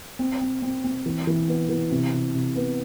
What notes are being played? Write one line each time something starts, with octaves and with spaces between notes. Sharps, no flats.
C4
C4
C4
C4
E3
E3
B3
E3
C3
C3
C3
B3